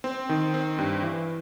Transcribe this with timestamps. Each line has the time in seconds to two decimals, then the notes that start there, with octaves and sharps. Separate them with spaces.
0.04 C4
0.29 D#3
0.54 C4
0.78 G2
1.03 E3